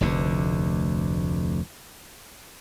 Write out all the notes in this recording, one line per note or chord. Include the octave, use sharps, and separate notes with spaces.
F1 D2 D3